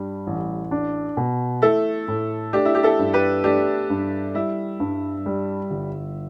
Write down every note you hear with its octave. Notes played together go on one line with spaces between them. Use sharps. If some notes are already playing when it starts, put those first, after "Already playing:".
Already playing: G2 G3
A1
D4
B2
A3 E4 A4
A2
A3 D4 G4
E4
G4
E4 A4
G2
G4 B4
A3 D4 G4
G2
G3 E4
G2
G3
G1